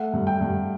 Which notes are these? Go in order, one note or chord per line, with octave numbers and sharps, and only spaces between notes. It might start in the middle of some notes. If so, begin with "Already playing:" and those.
Already playing: A3 F#5
G2
G5
G2